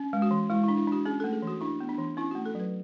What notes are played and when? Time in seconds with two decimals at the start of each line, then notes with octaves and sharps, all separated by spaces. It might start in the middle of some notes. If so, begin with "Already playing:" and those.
Already playing: C#4
0.13 G#3
0.22 F#4
0.31 E3
0.50 G#3 E4
0.64 E4
0.68 D4
0.77 E4
0.88 D4 F#4
1.05 C#4 G#4
1.20 A3 A4
1.33 G#4
1.42 E3
1.48 F#4
1.61 D4 E4
1.80 B3
1.89 D4
1.98 E3
2.17 C#4 E4
2.31 A3 F#4
2.46 A4
2.55 F#3 B4